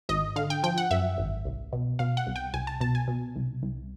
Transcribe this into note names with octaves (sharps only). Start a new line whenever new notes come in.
G#1 D#5
D3 F5
G5
F3 G5
F#5
F#2 E5
G#1
C2
B2
B2 F5
F#5
C2
G5
C2 G#5
A5
B2 A5
G#5
B2
C2
C2